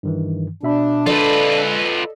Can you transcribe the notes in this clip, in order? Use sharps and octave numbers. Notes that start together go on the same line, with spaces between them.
G2 D#3 E3
B2 D4 E5 B5
F4 A4 B4 D5 D#5 A6